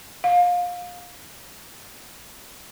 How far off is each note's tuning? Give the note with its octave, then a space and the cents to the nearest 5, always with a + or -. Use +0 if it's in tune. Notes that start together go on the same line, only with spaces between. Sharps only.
F5 +25